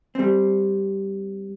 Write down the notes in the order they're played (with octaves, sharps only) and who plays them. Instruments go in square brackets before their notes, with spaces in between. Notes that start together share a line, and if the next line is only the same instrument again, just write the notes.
[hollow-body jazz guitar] G3 C4